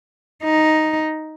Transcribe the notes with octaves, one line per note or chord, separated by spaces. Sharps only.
D#4